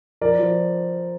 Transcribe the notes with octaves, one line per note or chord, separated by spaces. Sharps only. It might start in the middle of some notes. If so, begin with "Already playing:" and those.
F3 A#4 D5
F3